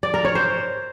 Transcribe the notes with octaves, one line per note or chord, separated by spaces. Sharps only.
D5
A#4
C#5
C5